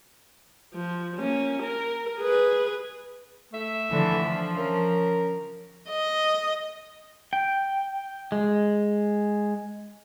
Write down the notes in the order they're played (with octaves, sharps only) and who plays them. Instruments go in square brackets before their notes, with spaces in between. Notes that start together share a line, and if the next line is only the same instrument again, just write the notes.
[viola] F3
A#3 C#4
A#4
G#4 B4
[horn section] A3 E5
[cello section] D3 E3 F3
F3
[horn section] C#4 A#4
[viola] D#5
[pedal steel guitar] G5
G#3